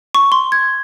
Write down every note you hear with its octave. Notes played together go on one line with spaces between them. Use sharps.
C#6
C6
G#6